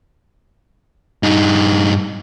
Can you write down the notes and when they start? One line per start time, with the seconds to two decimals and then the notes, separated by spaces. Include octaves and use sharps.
1.23 G2 D#4